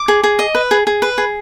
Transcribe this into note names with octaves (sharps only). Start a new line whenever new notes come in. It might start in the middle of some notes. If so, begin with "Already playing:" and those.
Already playing: D6
G#4
G#4
D#5
B4
G#4
G#4
B4
G#4